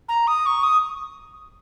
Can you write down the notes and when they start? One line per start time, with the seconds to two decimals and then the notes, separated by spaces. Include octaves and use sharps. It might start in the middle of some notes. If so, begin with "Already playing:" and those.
0.09 A#5
0.27 D#6
0.46 C#6
0.63 D#6